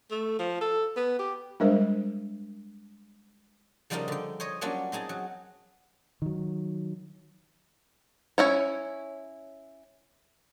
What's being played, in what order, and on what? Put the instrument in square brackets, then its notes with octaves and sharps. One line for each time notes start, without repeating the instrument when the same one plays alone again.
[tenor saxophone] A3
F3
A4
B3
G4
[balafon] G3 G#3 D4 A#4 C5
[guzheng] C#3 F3 G3 D#4 F4 A#4
D3 G5
C5 C#5 D#5
F#3 G3 A#3 C#4 D4 F4
C4 D#4 G#4 A5
F#3
[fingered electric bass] D#3 F#3
[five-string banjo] C#4 E4 C#5